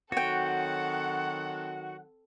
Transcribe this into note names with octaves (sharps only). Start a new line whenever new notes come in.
D#3 F#3 C4 F#4 A4 C#5 F#5 G5